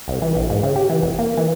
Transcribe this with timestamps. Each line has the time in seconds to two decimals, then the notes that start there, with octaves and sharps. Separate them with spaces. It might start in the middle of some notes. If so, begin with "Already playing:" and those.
0.08 C2
0.22 E3
0.35 A#1
0.50 G#2
0.63 C#3
0.76 G4
0.90 E3
1.02 F1
1.19 A#3
1.37 E3